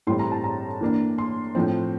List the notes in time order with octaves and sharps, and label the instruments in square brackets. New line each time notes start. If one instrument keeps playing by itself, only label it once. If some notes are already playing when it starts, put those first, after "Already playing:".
[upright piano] A2 E3 G3 C4 C6
A#5
A5
A#5
E3 A#3 D4
C6
A2 F3 C4